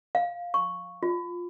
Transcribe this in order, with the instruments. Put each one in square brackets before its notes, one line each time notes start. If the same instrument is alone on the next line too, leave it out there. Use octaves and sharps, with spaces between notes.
[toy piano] F5
C#6
F4